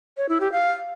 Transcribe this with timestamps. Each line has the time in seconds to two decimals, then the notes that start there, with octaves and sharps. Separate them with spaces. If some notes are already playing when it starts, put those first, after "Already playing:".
0.17 C#5
0.29 E4
0.40 G4
0.52 F5